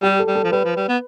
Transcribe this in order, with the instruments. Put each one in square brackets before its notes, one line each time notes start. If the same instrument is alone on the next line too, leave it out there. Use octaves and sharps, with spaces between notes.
[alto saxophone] G3 [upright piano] G4
[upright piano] A4
[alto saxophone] G3
[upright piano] A4
[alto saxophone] F3
[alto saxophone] G3 [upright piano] B4
[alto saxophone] F3
G3
B3